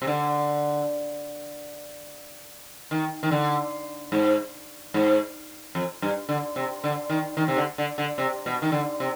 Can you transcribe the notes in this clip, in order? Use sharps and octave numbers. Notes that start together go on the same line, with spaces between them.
C3
D3
D#3
D#3
D3
G#2
G#2
F2
G2
D3
C3
D3
D#3
D#3
C3
D3
D3
D3
C3
B2
D#3
D3
C3